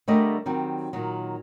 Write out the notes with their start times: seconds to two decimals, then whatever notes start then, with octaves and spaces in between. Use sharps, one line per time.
0.08 D3 G3 A3 A#4 D5 D#5
0.46 D#3 F#3 G3 C4
0.93 A#2 D#3 F#3